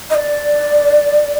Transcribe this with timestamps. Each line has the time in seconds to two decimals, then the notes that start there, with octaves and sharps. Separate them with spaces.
0.10 D#5
0.15 D5